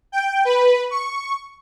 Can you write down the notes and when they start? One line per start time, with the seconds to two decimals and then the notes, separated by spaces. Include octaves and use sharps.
0.12 G5
0.45 B4
0.91 C#6